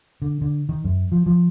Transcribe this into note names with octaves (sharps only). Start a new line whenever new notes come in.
D3
D3
D#3
F#2
F3
F3